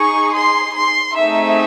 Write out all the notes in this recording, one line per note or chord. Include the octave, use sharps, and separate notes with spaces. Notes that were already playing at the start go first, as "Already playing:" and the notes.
Already playing: D#4 G#4 C#6
C6
C6
A3 C4 D#4 G#4 E5